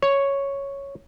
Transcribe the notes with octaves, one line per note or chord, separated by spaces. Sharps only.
C#5